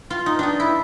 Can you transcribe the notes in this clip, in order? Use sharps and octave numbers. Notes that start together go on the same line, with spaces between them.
F4
D#4
D4 D#4
E4